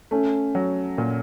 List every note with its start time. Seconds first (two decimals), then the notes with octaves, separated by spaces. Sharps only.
0.11 A3 C#4
0.55 F#3
0.98 A#2